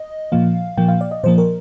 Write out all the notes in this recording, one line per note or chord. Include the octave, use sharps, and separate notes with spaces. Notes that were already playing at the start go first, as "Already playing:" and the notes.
Already playing: D#5
A#2 F3 A#3 F5
A#2 F3 A#3 G5
F5
D5
D#5
A#2 F3 A#3 C5
A#4